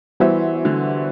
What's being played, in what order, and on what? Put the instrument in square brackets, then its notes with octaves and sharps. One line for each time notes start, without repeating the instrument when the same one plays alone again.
[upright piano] E3 [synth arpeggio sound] G3 B3 F#4 C5 E5
[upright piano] D3